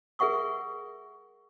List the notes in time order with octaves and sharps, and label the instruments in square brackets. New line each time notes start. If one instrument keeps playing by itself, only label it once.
[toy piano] G#4 A#4 E5 F#5 C#6 D#6